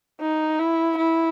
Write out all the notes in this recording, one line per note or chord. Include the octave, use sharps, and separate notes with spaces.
D#4
E4
E4